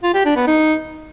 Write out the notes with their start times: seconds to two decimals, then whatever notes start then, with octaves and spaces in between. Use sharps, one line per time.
0.03 F4
0.14 G4
0.25 D4
0.36 B3
0.47 D#4